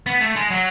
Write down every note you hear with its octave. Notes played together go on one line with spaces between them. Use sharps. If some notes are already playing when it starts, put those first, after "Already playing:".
B3
A3
G#3
F#3